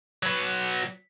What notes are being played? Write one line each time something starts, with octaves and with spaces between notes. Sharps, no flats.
F#3 B4